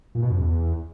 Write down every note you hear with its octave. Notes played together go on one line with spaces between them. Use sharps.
A#2
B2
F#2
E2